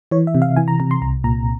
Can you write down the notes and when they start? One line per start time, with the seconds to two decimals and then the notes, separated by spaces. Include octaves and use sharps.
0.11 E3 C#5
0.27 E5
0.35 C3
0.42 F5
0.57 E3 G#5
0.68 A#5
0.80 C3 A#5
0.91 C6
1.01 C2 A#5
1.24 A#2 A#5